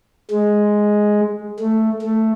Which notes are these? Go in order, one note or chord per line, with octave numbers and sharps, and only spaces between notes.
G#3
A3
A3